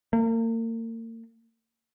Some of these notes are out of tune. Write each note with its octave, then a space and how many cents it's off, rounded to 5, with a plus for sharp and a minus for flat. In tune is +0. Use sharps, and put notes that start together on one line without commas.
A#3 -40